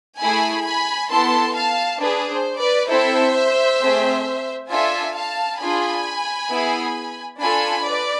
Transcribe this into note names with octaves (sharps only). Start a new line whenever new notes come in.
A3 E4 G#4 G#5 B5
G#5 B5
B3 E4 A4 A5 C6
F5 A5
D4 G#4 B4
C5
B4 D5
C4 E4 A4 C5 E5
A3 C4 G#4
D4 F4 A4 E5 G#5
F5 A5
D4 F4 G#4 G#5 B5
B3 E4 G#4
D4 F4 A4 G#5 B5
B4 D5